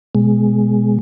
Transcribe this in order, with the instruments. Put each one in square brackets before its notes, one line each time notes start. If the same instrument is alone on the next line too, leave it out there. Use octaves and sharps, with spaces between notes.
[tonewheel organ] B2 G#3